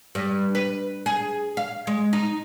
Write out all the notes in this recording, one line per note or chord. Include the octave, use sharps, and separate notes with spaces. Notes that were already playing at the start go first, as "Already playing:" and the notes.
G2
B4
G#4
F5
G#3
D#4